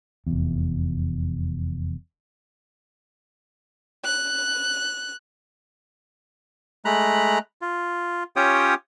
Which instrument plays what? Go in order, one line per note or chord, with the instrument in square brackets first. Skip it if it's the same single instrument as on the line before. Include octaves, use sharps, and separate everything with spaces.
[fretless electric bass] F1 E2
[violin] F#6
[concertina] G#3 A3 A#5 B5 F#6
F4
C#4 F4 G4 C#5 G5 D#6